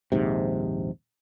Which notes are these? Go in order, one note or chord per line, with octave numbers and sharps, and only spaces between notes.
A#1 D#2 G#2 C3